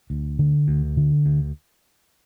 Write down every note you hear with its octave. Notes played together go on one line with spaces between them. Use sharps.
D2
D3
D2
D3
D2